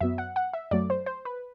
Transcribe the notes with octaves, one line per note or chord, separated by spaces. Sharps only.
F#2 F#3 B3 E5
F#5
F#5
E5
F#2 F#3 A3 D5
C5
C5
B4